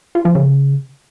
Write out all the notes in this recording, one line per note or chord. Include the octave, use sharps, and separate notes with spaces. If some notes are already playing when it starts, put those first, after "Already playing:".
F4
F3
C#3